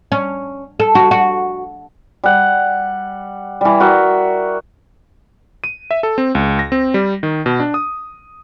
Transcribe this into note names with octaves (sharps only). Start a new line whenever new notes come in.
C#4
A4
F#4
F#4
G3 F#5
E3 G3
F#4 A#4 D5 E5
D#7
E5
A4
C4
C#2
A#6
C4
G3
D#3
B2
D4
D#6